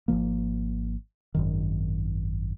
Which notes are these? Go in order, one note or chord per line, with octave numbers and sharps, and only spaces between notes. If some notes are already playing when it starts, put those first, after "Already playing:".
G#1 D#2 F3 A#3
G#1 F#2 D#3